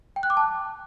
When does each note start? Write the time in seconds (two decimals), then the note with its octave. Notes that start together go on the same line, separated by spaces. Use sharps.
0.16 G5
0.23 F#6
0.30 D6
0.37 A5